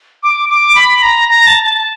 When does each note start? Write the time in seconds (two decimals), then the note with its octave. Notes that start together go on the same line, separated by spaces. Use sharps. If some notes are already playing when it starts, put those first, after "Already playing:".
0.23 D6
0.49 D6
0.75 B5
1.02 A#5
1.28 A#5
1.47 A5
1.64 A5